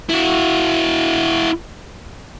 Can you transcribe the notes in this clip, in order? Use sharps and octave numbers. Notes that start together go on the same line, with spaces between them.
E4 F#4